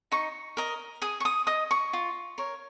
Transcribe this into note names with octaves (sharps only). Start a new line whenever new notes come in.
D#4 C#6
A#4 D#5
G#4 D#6
C#6
D#6
D#5 D#6
C#6
F4
A#4 C#5